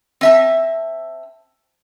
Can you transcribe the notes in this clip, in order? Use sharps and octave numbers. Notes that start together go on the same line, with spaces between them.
C4 E5 A5